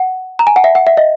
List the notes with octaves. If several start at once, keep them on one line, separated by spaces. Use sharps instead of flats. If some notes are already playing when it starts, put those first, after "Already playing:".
Already playing: F#5
A#5
G#5
F#5
E5
F#5
E5
D#5